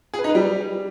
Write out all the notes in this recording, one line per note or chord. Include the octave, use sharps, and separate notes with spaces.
G#4
B4
D#4
B4
G3